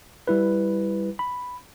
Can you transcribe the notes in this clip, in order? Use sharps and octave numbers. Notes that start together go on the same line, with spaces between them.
G3 E4 B4
B5